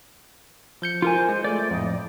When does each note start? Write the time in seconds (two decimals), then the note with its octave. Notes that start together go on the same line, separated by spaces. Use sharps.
0.82 F3 G6 C#7
1.02 F4 A#4 C5 G#5
1.29 G#3
1.44 A3 D5
1.71 F2 A2 D#5